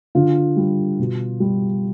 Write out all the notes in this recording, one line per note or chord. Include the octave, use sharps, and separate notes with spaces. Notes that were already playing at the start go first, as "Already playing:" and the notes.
D3 F4
G3
B2
G3